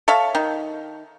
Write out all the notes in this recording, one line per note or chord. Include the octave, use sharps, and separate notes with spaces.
A4 C#5 E5 F5
D#3